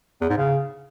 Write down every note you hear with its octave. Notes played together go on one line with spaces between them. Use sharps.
E2
G#2
C#3